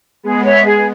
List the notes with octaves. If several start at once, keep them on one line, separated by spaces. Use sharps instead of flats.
G#3 B3 G#4
C#5 E5
G#4